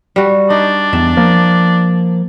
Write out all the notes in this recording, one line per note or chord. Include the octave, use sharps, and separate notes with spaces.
G3 F#4
D4 D#4
E2 E5
F3 A#3